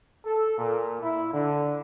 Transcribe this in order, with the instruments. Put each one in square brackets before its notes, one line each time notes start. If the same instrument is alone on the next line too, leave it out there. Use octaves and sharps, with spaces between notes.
[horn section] A4
A#2
E4
D3